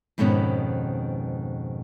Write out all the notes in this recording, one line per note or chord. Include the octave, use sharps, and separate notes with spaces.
F2 G#2 B2 D#3 B3 C#4